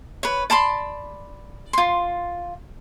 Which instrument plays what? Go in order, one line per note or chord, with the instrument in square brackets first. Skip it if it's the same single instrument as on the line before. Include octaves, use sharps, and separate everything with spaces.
[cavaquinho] B4 C#5
D5 A5 B5 C6
F4 C6